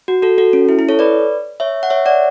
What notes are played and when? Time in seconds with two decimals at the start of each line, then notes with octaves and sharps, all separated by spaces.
0.08 F#4
0.22 F#4 A4
0.38 F#4 A4
0.53 C#4
0.69 E4
0.79 E4
0.89 A4 C#5
0.99 B4 D5
1.60 C#5 E5
1.83 F#5
1.90 C#5 E5
2.06 D5 F#5